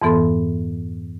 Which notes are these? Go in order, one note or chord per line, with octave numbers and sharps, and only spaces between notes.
F2 G#2 E3 B3 A4 C6